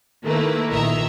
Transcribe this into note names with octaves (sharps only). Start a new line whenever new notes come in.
D#3 A3 A#3 E4 A#4 B4
A#1 D#3 D#5 E5 A#5